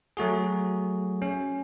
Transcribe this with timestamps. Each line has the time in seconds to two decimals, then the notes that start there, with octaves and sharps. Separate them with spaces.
0.17 F#3 A3 F#4 G#4
1.22 C#4